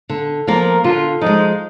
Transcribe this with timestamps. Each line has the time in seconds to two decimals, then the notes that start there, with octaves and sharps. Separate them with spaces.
0.09 D3
0.47 F3 A#3 F4 A#4
0.84 D3 F4
1.21 F3 G#3 D#4